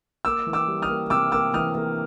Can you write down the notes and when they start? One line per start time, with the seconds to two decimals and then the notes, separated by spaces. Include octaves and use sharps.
0.25 A#3 D6 E6
0.47 E3
0.53 D6 E6
0.68 G3
0.82 D#6 F6
0.89 A#3
1.10 C3 D6 E6
1.32 A#3 D6 E6
1.54 E3 D#6 F6
1.75 A#3